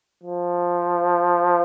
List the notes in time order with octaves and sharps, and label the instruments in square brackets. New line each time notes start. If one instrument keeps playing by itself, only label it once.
[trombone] F3